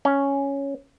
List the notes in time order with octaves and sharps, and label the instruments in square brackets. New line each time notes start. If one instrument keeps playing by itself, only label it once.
[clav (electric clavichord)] C#4